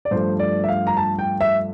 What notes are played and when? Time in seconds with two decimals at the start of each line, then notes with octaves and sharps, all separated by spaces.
0.05 D5
0.11 G2 F3 A3 C5
0.39 D5
0.64 E5
0.68 F5
0.87 A#5
0.97 A5
1.19 G5
1.41 E5